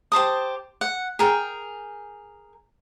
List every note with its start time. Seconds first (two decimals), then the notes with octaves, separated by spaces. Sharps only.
0.12 G4 C5 A5 D#6
0.81 F#5
1.19 G#4 A#4 G5